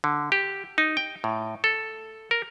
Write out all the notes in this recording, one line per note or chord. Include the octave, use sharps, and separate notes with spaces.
D3
G4
D#4
G5
A2
A4
A#4